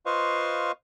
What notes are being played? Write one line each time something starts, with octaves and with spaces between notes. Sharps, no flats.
F4 B4 C5 D#5 F5 C#6